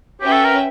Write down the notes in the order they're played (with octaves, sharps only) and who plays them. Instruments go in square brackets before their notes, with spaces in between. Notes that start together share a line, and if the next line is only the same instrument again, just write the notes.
[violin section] C#4 F#4 B4 E5 G5 [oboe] G4
[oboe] A4
A#4